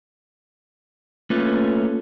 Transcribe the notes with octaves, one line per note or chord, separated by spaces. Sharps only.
A3 A#3 C#4 F4 B4